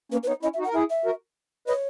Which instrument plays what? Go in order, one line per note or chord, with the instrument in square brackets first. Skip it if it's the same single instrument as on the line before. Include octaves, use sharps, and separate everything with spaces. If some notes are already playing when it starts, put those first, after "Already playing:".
[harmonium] A#3 C#4 [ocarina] B4
[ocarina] B4
[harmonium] B3 D#4 [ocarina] C#5
[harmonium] C#4 E4 [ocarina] D#5
[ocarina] E5
[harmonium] D#4 F#4
[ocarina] F#5
[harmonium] A#4
[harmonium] E4 G#4 [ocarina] E5
[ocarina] E5
[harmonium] F#4 A#4
[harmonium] B4 D#5 [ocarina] C#5